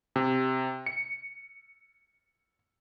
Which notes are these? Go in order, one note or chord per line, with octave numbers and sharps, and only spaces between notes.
C3
C#7